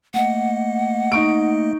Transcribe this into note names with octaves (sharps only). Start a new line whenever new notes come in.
A3 A#3 D#5 F#5
D#4 C#6 D7